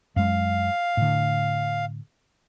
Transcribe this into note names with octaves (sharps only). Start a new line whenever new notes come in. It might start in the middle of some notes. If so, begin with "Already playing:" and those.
F#2 G#3 F5
A2 D3